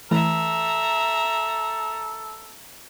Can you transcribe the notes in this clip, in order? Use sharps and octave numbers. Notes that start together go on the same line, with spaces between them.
E3 A3 A4 B4 E5 A#5